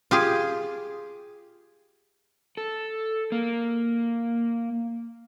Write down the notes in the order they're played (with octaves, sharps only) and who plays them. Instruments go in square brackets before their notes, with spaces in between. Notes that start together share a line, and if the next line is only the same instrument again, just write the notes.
[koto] F4 G4 G#4
[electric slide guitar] A4
A#3